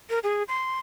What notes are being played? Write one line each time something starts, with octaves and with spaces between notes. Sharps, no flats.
A#4
G#4
C6